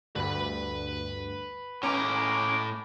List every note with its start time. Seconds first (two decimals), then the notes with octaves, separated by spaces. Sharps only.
0.16 D2 G2 B4 B5
1.83 A2 G#3 A#3 C#4 A#5 D6